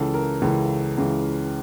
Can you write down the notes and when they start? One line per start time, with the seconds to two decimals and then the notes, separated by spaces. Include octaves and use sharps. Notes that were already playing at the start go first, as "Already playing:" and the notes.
Already playing: C#2 C#3 E3 A4
0.14 A#4
0.42 C#2 C#3 E3 A4
0.97 C#2 C#3 E3